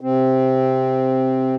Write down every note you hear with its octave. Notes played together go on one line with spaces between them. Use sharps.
C3 C4